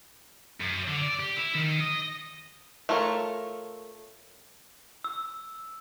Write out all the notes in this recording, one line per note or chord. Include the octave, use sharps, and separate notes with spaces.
F#2
D3
D5
G4
E4
D#3
D#5
A3 F4 A4 A#4 C#5
E6